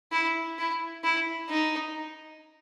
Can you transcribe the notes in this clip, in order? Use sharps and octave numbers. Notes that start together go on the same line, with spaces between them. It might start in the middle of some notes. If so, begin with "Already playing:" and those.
E4
E4
E4
D#4